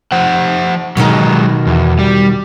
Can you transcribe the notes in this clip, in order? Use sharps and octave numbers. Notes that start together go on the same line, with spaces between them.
F3 C5 F#5
B2 D#3 F#3 G#3 D#4
E2
G3